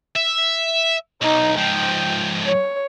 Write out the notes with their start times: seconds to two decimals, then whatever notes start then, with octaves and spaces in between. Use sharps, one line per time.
0.15 E5
1.22 B1 D#4
1.57 G#2 F3 G5
2.45 C#5